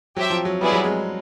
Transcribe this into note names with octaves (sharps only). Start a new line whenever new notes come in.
F#3 G4 C5 E5 G5
F3
F#3
G3 B3 E4 G#4 B4 D5
F#3
G#3